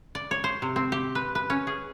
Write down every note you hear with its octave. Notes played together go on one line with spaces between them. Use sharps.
D5
C#5
C5
C3
C4
G4
B4
B4
C#4
G#4